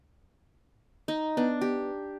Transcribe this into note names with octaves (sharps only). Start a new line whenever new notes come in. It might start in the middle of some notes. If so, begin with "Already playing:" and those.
D#4
B3 D4
G4